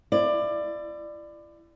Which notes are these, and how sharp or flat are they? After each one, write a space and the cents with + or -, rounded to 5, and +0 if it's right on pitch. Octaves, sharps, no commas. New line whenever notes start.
E4 +35 D5 +20